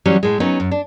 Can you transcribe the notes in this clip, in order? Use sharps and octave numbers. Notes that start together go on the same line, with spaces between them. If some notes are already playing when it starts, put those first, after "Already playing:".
E3 F#3 G3 C#4
A2 G#3
F#3 B3 C#4 D#4
F#2
D4